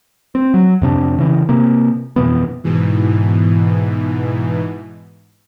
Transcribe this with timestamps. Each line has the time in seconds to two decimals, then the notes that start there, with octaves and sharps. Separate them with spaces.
0.35 C4
0.54 F#3
0.82 F2 C3 D4
1.18 C#3 E3
1.49 C3 A#3
2.16 F2 B2 E3 B3
2.64 G#2 B2 E3